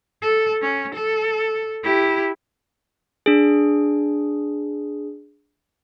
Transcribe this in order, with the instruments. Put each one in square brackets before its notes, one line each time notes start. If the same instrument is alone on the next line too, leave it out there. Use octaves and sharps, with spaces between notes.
[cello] A4
C#4
A4
E4 G4
[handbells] D4 G#4